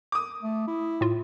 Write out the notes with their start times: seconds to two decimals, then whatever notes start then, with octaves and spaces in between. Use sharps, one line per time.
0.12 D6 D#6
0.42 A3
0.68 E4
1.01 A2 F4